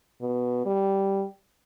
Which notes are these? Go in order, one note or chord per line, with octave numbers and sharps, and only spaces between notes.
B2
G3